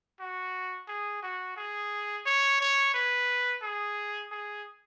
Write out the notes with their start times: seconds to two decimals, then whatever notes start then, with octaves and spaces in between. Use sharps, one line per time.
0.20 F#4
0.88 G#4
1.23 F#4
1.57 G#4
2.26 C#5
2.61 C#5
2.94 B4
3.62 G#4
4.32 G#4